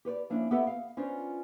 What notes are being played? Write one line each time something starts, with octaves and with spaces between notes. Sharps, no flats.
G4 B4 C#5 D5
F3 A#3 C#4 D4 E4
B3 G4 A4 B4 E5
F5
B3 C#4 D4 F4 C5